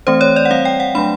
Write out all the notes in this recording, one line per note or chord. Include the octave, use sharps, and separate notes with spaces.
E3 A3 C4 C5
C#5
D5
F#5
G3 C4 F5
G5
F#5
F#3 A3 D4 B5